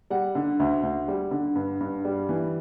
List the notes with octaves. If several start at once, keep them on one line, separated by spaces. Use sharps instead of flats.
G3 F#5
D3
D2
D2
G3
D3
G2
G2
G3
E3